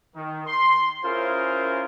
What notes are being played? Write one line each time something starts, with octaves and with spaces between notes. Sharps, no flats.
D#3
C6
C#4 E4 F4 G#4 A#4 C5